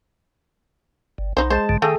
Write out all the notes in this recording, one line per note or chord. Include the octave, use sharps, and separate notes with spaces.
G1
B1 D#4 C5
G#3 C5 A5
B1 G#2 D3
D#3 A3 G#4 A4 G5